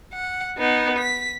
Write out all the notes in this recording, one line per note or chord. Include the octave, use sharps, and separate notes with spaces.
F#5
B3 D#4
B6